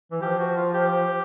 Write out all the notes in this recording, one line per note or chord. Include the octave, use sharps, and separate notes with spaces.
E3
F3 G4
F#4
F4
G4